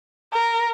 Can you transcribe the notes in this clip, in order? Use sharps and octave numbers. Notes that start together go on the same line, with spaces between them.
A#4